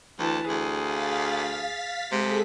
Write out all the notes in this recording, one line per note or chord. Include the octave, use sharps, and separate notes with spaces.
D2 E3 A5
D2 G#4
F5 A6 B6
C3 G#3 G#4 A4 B6